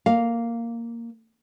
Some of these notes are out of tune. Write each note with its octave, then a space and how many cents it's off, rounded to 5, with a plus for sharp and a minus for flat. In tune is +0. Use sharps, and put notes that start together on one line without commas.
A#3 -5 F5 +0